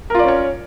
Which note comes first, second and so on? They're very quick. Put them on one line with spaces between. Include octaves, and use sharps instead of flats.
A#4 F4 D5 C#4 C#5